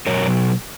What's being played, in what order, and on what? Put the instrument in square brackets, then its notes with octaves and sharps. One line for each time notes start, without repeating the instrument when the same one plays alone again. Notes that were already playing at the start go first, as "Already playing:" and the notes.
[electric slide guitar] B2 F#3 A#4 C#5